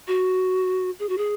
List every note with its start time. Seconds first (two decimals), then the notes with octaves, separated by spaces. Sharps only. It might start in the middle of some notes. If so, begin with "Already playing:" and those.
0.07 F#4
0.99 G#4
1.09 F#4
1.18 G#4